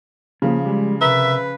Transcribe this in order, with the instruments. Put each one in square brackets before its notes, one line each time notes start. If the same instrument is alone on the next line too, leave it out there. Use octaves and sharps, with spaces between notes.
[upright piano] C#3 F3 [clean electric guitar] A#3
[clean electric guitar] G3 G#3
[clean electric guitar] C3 A#4 A#5 [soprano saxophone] B4 [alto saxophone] E5